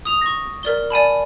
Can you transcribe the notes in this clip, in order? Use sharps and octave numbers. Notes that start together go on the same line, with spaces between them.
D#6 F7
C#6 A#6
A#4 D5 G7
D5 G#5 A5 B5